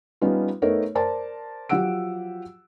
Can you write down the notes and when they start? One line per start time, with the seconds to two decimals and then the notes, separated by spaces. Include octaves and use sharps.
0.21 G3 B3 C#4 D#4 F4
0.62 A3 B3 D#4 A4 A#4 C#5
0.95 A#4 C5 D5 A5
1.69 F3 F#3 G4 F#5 E6 D7